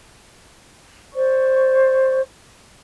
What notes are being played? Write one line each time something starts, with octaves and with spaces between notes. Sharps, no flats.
C5 D5 C#6